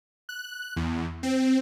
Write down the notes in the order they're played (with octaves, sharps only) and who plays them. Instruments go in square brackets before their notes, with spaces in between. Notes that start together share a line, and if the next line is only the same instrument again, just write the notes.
[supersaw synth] F#6
E2
C4